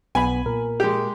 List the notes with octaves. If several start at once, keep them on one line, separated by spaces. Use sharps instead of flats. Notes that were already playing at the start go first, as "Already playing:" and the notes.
B1 B3 G#5 B5
A#2 A#4
G#3 G4